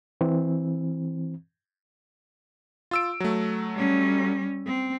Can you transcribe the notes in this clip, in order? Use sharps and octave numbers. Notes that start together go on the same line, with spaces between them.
E3 C4
F4 E6 D7
F#3 A3
G3 C#4
C4